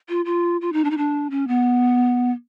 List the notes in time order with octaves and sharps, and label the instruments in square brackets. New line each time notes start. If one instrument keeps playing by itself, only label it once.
[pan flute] F4
F4
F4
D#4
D4
D#4
D4
C#4
B3